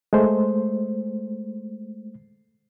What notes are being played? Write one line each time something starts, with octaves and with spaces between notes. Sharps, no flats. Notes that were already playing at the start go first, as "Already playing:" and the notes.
G#3 A3 C5